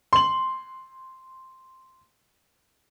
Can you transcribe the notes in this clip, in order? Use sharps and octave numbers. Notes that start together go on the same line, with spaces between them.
C6 F#7